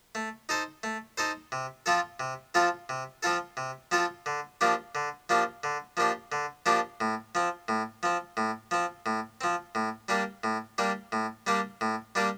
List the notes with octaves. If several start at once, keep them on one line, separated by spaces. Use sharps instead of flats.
A3
D#4 A4 C5
A3
D#4 A4 C5
C3
F3 C4 F4 A4
C3
F3 C4 F4 A4
C3
F3 C4 F4 A4
C3
F3 C4 F4 A4
D3
F3 A#3 D4 G4
D3
F3 A#3 D4 G4
D3
F3 A#3 D4 G4
D3
F3 A#3 D4 G4
A2
F3 C4
A2
F3 C4
A2
F3 C4
A2
F3 C4
A2
G3 A#3 D4 G4
A2
G3 A#3 D4 G4
A2
G3 A#3 D4 G4
A2
G3 A#3 D4 G4